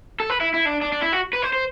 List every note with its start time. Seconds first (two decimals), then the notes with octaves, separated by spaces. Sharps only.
0.20 A4
0.30 B4
0.41 E4
0.54 E4
0.66 D4
0.82 D4
0.92 D4
1.02 E4
1.12 F#4
1.33 B4
1.42 C5
1.53 C5